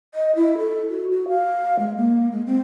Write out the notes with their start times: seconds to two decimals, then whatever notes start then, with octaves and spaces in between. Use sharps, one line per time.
0.15 D#5
0.36 E4
0.58 A4
0.90 F#4
1.11 F#4
1.29 F5
1.79 G#3
1.97 A#3
2.32 G#3
2.47 C4